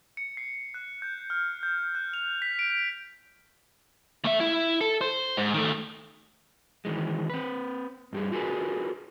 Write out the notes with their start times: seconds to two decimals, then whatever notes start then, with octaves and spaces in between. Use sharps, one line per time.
0.17 C#7
0.37 C7
0.74 F#6
1.02 G6
1.30 F6
1.63 G6
1.95 F#6
2.14 F7
2.42 B6
2.59 D7
4.25 A3 E5
4.40 E4
4.81 A4
5.01 C5
5.37 G#2
5.54 D#3 A3
6.85 D#3 E3 G#3
7.30 C4 B4
8.13 G2 G3 G#4
8.32 F4 F#4 G#4 A#4 B4